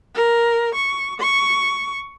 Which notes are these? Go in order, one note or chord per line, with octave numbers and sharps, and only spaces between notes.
A#4
C#6
C#6